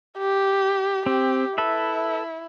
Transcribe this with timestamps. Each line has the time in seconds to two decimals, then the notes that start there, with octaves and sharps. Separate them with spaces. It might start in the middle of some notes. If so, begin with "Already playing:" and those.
0.18 G4
1.06 C4 G4
1.58 E4 A4 B4 E5